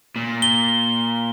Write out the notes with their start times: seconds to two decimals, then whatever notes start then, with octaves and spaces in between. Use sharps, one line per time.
0.16 A#2
0.42 G7